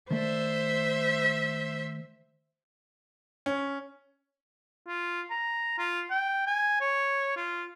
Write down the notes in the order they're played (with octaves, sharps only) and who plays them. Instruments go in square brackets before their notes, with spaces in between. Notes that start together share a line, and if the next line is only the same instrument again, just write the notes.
[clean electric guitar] D#3 A3 D5 [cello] C5 E5
[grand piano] C#4
[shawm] F4
A#5
F4
G5
G#5
C#5
F4